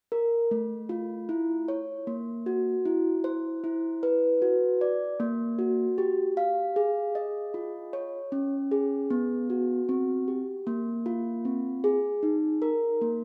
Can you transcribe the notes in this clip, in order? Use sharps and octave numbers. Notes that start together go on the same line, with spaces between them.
A#4
A3
F4
E4
C#5
A#3
F#4
E4
C5
E4
B4
F#4
D5
A#3
F#4
G4
F5
G#4
D#5
F4
C#5
C#4
G#4
B3
F#4
C4
G4
A#3
F4
C4
G#4
D#4
A#4
A#3